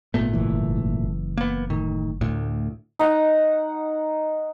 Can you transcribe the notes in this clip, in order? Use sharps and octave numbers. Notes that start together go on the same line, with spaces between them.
G#1 A#2 A3 B3
F#1 E3
A#3 B3
A2 D#3
D2 A2
D#4 F#5